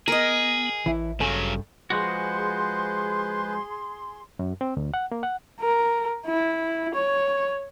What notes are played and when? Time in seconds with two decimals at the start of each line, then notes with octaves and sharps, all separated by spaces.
0.08 B3 G#4 A#4 D#5
0.86 A1 E3 E4
1.20 G2 C#3 F#3 A4 G#5
1.90 F3 G#3 F#4 G#4 B4 C5 C6
4.39 F#2
4.61 C4
4.77 D2
4.94 F#5
5.12 A#3
5.23 F#5
5.61 A#4
6.26 E4
6.95 C#5